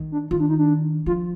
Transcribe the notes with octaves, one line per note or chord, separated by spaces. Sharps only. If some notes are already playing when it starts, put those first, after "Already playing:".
Already playing: D#3
D4
D#3 F4
D4
D#4
D4
F3 F4